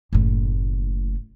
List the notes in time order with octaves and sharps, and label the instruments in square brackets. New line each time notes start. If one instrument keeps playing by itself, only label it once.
[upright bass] F#1 A2